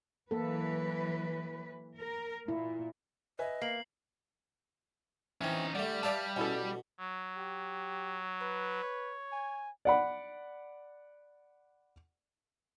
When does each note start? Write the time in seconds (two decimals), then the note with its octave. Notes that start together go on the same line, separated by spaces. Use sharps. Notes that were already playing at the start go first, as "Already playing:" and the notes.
0.31 E3 F#3 A#3 A4 B4
1.99 A#4
2.48 A#2 E4
3.39 B4 D#5 E5 G#5
3.62 A#3 C7 F#7
5.41 E3 C4 C#4 D#4
5.75 D3 G3 A3 D5
6.03 G3 B4 D5 E5 F5 A5
6.36 B2 C#4 E4 A4
6.99 F#3
7.37 G4
8.41 B4
8.83 C#5
9.32 G#5
9.85 D5 F#5 B5